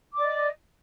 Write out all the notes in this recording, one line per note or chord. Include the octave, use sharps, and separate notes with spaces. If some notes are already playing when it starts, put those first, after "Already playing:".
D5 D#5 D6